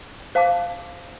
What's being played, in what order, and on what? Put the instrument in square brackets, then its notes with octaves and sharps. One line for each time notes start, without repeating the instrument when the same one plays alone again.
[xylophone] C5 F5 A5 D6